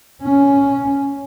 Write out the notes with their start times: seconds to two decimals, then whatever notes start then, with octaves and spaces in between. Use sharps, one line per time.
0.23 C#4